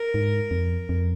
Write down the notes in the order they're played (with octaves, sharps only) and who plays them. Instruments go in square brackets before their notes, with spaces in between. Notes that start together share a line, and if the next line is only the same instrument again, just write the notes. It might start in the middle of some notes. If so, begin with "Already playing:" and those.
Already playing: [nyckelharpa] A#4
[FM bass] G#2
F2
F2